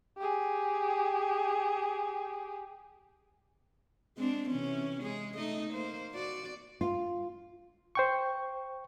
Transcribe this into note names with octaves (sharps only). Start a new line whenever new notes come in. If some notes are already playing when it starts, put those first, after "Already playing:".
G4 G#4
G#3 C4 D4
C3 E3 C#4
G#3 G#4
A3 D#4 D#5
A#3 C5
F#4 D5
F4
C5 G5 C#6